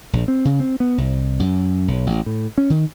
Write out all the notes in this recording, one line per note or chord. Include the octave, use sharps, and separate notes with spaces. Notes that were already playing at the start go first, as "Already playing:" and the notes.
A#1
C4
C#3
C4
B3
C2
F#2
B1
A1
A2
C#4
D#3